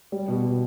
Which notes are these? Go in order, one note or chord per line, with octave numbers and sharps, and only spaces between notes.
G3
B2
B2